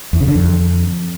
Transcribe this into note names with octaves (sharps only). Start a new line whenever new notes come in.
E2
C#3
D3
F2